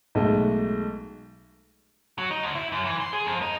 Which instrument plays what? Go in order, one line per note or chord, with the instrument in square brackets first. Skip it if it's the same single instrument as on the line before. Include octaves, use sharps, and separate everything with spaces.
[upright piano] B1 G#3 A3
[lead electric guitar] F#3
D#4
D2
E4
F#2
E3
C6
G#4
F2
D#4